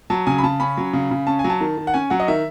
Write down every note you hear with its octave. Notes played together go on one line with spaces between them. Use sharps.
F#3 A5
C#3 G#5
B5
C#3 A5
C#4 B5
F#3
C#3
C#3
C#4 A5
G#5
F#3
A5
D#3
D#3
F#5
C#4 G#5
F#3 F#5
D#5
D#3 E5